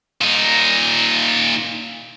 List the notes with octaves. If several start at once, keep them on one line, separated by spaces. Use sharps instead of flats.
A#2 D#4